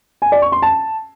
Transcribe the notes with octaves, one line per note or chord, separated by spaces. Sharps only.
G#5
D5
C#6
C6
A5